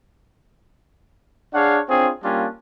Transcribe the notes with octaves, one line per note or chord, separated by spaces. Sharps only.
D4 G#4 C#5 F5 F#5
C4 D4 F4 G#4 C#5
G3 A#3 C#4 D4 F4